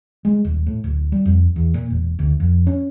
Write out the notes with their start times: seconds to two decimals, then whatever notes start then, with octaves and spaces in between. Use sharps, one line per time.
0.25 G#3
0.45 D#1
0.67 A2
0.84 D1
1.12 G3
1.26 F2
1.56 E2
1.74 A#2
1.90 E1
2.19 D2
2.40 F2
2.67 C#4